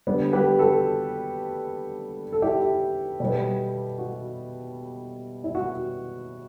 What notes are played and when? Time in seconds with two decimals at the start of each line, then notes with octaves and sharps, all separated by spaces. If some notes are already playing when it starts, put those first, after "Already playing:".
0.07 D3 G3 B3
0.33 G4 B4
0.59 F#4 A4
2.32 A4
2.42 E4 G4
3.20 B2 G3 B3
3.98 F#4
5.44 E4
5.55 F#4